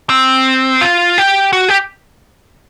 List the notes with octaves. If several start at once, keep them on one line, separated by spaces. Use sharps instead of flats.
C4
F4
G4
F#4
G4